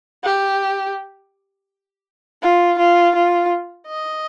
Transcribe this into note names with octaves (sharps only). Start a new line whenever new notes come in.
G4
F4
F4
F4
D#5